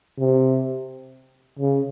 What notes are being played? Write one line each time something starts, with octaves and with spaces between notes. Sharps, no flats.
C3
C#3